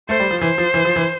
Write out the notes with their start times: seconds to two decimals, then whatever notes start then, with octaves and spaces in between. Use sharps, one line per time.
0.09 A3 C5
0.20 G3
0.31 F3
0.41 E3 C5
0.58 F3
0.74 E3
0.85 F3
0.96 E3